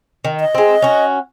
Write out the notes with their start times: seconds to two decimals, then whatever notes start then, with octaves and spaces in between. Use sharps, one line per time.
0.25 D#3
0.40 D#5
0.55 G#3 C4
0.82 C#4 F#4